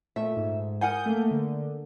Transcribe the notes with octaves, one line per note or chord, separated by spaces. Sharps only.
A#2 A3 E5
G#2
A#4 F#5 G#5 D#6 G6
A3 A#3
D3